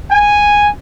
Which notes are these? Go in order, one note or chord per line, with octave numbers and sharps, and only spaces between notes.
G#5